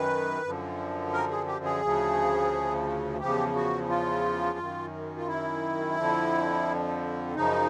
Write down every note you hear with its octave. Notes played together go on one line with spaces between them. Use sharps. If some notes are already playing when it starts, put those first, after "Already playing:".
Already playing: F#2 D#3 B4
F#2 D3 F3
A#4
G#4
G4
G#4
D2 C#3 F3
E2 C#3 F3 G4
F#4
F4
F#2 D#3
F4
E4
F2 D3 F3
F#2 C#3 F3 D#4